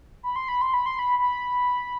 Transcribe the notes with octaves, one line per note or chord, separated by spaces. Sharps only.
B5
C6
B5
C6
B5
C6
B5
B5